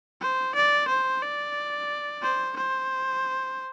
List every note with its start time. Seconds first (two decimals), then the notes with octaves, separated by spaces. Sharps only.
0.21 C5
0.55 D5
0.88 C5
1.22 D5
2.22 C5
2.57 C5